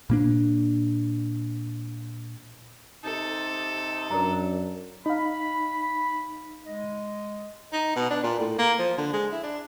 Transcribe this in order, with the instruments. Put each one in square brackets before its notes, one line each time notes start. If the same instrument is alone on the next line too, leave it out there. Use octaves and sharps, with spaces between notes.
[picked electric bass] A#2 A#3 D4
[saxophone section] C3 D#4 [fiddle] A4
[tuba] F#2 [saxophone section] D4 [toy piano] A#4 A#5
[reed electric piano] D#4 F5 [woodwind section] B5
[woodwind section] G#3 D#5
[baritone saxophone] D#4
B2
D4
A#2
A2
A#3
F3
D3
G#3
E4
D4